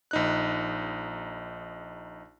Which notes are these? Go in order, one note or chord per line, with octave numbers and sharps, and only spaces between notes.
A#1 D#4 F#6